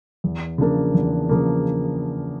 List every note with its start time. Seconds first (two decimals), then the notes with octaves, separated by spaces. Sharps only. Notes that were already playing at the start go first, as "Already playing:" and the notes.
0.24 E2
0.58 C#3 F3 A#3 D4
0.94 E2
1.29 C#3 F3 A#3 D4